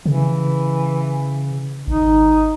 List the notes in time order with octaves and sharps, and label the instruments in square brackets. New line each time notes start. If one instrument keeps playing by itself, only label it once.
[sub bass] C#3 [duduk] E3
[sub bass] G#1 [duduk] D#4